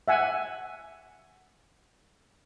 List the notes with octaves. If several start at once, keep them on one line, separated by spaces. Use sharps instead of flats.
E5 F#5 G#5